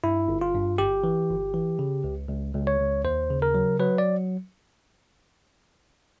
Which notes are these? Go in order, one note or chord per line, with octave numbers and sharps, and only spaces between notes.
G2 E4
G1
F4
G2
G1 G4
E3
G1
E3
C#3
C#2
C#2
C#2
C#5
C#2
D#2 C5
C#3
A#4
F#3
F#3 B4
D5